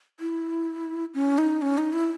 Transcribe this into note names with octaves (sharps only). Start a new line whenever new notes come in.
E4
C#4
D#4
C#4
D#4
E4